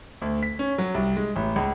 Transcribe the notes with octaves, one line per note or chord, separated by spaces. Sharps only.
D2
B6
C#4
F#3
C2
G#3
A1
C#2